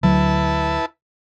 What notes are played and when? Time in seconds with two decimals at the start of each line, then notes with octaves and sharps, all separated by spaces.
0.03 D2 F#3 E4 B4 A5